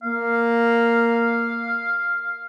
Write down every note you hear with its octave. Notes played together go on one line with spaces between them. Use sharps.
A#3 F5